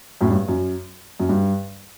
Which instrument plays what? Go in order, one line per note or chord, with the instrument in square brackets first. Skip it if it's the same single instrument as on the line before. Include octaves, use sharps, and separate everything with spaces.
[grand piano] F#2 A2
G2
F#2
F#2
G2